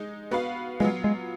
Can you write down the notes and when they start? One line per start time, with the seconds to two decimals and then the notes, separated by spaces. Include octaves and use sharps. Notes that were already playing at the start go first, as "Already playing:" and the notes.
Already playing: G#3 D#4 D#5
0.31 B3 F#4 B4 F5
0.80 F#3 G#3 B3 F4
1.04 G#3